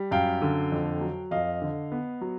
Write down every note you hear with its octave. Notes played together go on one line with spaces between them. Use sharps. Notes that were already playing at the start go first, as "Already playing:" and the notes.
Already playing: G3
F#2 F5 G5
D3
F2
F#3
F2 D#5 F5
D3
B3
F#3